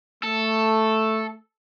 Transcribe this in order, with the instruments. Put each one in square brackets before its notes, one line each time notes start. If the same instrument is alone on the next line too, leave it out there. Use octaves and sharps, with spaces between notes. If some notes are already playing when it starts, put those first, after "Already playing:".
[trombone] A3 [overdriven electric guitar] A4